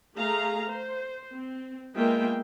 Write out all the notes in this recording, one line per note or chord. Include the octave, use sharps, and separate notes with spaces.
A3 G#4 F5 A#5
C5
C4
G#3 A#3 B3 F4 E5 G5